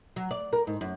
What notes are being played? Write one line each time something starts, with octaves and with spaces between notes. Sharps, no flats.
F#3
D5
A#4
G#2
F#2